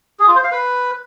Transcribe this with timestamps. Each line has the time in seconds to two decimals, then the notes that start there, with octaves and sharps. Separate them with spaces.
0.19 G#4
0.28 F4
0.36 C5
0.44 F5
0.52 B4